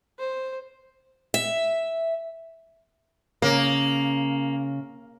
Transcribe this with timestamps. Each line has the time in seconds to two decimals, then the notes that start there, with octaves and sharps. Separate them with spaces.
0.19 C5
1.34 E5
3.42 C#3 A#3